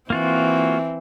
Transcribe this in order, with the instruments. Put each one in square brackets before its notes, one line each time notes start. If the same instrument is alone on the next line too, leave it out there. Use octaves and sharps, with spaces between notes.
[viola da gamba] E3 C4 [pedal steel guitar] A#3 F4 F#4